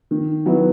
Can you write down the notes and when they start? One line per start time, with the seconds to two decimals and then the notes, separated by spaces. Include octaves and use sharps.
0.11 D#3
0.46 F#3 B3 E4